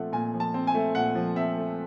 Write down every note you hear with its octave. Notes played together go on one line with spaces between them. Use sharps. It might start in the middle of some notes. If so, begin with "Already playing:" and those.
Already playing: A#2 F3 A3 C4 F#5
A#2 G#5
F3
A5
C4
G#5
A3
A#2 F#5
F3
C4 E5
A3